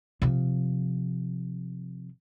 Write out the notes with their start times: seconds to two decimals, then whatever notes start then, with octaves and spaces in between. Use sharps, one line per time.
0.22 C3 F3